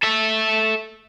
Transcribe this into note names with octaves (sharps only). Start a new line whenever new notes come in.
A4 E5